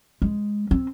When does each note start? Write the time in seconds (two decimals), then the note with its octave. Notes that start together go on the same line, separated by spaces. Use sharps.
0.22 G#3
0.71 C4